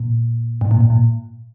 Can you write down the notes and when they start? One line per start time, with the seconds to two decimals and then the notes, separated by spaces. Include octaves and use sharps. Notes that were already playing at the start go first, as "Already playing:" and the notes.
Already playing: A#2
0.61 G#2
0.71 A#2
0.81 G#2
0.90 A#2